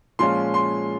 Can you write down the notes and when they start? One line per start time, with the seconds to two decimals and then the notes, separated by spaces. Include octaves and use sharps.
0.19 A#2 F3 G#3 C#4 F4 C6
0.54 C6